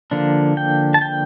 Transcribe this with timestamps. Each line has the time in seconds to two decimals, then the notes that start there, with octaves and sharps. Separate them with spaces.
0.11 D3 F3 A#3 D4
0.57 G5
0.94 A5
1.01 G5